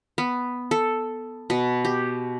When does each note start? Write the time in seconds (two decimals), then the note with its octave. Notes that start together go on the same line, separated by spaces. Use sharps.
0.18 B3
0.71 A4
1.50 B2
1.85 G4